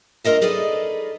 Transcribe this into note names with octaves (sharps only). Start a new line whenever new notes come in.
G2 F4 A#4 D#5 E5
D#4 G#4 A4 B4 D5 D#5